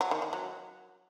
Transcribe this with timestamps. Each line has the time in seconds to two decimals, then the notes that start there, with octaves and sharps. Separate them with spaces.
0.01 F#3
0.11 D#3
0.22 D#3
0.33 F#3